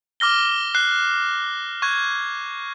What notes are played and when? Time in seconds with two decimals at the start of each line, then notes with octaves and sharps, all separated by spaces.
0.20 D6 F6 A#6 G7
0.75 F#6 C7
1.82 C#6 F#6 G#6